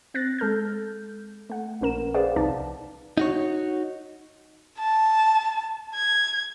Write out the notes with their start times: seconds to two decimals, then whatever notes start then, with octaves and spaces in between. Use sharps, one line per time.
0.14 C4 F#6 A6 A#6
0.38 G#3 A4 F6 G6
1.50 A3 F#5
1.81 A#1 C#4 A#4 E7
2.14 G#4 B4 C5 D5 F5 F#5
2.36 C2 F3 D#4 D5 A5
3.18 D#4 F#4 C#5
4.79 A5
5.95 G#6